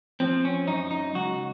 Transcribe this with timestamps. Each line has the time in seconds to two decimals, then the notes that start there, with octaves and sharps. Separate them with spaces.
0.20 F3 C4
0.45 C#4
0.67 F#2 D#4
0.91 D#4
1.15 C#2 F#4